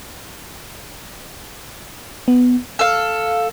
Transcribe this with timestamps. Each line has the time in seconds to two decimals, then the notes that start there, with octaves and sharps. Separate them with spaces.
2.28 B3
2.79 A4 F5